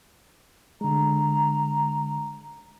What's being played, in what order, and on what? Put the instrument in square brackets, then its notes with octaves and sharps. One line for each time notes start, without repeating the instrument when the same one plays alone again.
[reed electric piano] D3 G#3 [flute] A#5